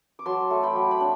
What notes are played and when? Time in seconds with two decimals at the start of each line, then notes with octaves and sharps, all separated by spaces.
0.19 D6
0.26 F#3 A5 C6
0.50 A3
0.63 G5 B5
0.75 F#3
0.91 B5
1.00 D4